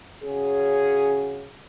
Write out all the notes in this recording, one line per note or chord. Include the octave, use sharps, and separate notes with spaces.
C#3 C#4 F#4 G#4